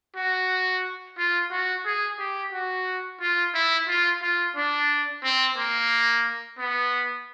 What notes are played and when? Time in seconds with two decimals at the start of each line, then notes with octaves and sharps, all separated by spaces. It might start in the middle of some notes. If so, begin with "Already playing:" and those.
0.16 F#4
1.18 F4
1.51 F#4
1.85 G#4
2.19 G4
2.52 F#4
3.21 F4
3.54 E4
3.88 F4
4.22 F4
4.56 D4
5.23 C4
5.57 A#3
6.58 B3